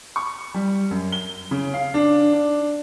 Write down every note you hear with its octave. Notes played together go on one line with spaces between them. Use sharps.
C#6
G3
F#2
G7
C#3
F5
D4
D4